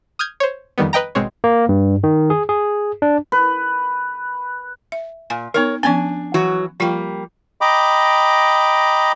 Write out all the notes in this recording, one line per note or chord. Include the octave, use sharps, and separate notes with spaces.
D#6 F6 G6 G#6
C5 C#5
F2 D#3 G3 B3
B4 D#5 G5 A#5
G#1 B2 G#3 C4 C#5
A#3
G2
D#3
G#4
G#4
D4
B4
E5
A#2 G#5
B3 D#4 A#4 C#5
F3 B3 C#4 D4 G#5
E3 F#3 F#4
F3 G3 A#3 F4 G5
D#5 G5 A#5 B5 D6